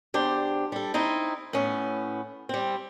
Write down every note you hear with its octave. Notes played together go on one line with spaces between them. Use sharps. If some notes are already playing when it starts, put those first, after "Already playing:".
E2 D4 G4 C5
G3 A4
C4 D#4 E4
A2 B3 C#4
G3 C4